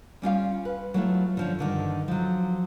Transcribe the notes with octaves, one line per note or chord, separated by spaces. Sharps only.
G3 C#4 F4 F5
B4
F#3 A3 E4 F4
D3 F3 C#4
G2 D3 D#3
F3 F#3